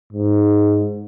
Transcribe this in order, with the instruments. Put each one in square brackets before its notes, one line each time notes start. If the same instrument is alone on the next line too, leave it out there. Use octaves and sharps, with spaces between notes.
[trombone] G#2